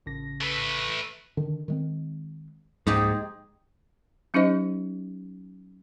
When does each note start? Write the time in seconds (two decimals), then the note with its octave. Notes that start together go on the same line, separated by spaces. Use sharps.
0.06 A1 C#3 A#6
0.41 A3 B4
1.37 D3 D#3 D4
1.68 D#3 G#3 C4
2.87 C#2 G#2 F3 A#3 D#4 G4 G#4
4.34 F#3 C#4 D#4 G4 C5 D#5